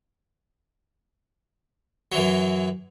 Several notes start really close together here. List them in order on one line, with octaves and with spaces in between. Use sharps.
F#3 E3 F#2